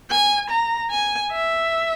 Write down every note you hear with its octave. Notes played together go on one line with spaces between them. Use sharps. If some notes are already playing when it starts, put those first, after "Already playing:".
G#5
A#5
G#5
E5